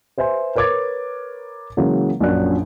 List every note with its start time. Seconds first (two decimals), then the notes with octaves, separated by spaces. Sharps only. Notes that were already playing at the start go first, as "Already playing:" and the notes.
0.18 B4 C5 E5 G#5 C6
0.56 A#4 B4 C#5 D6 G#6 A6
1.77 C#3 E3 F#3 G#3 A#3
2.20 A#1 F#2 F3 F#3 D4 F#6